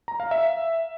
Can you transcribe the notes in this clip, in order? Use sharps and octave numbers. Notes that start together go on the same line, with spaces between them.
A#5
F5
E5